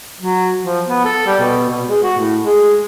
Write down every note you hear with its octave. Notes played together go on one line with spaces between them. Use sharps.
F#3
F3
B3
A4
G3
B2
B2
G#3
F#4
A2
G#3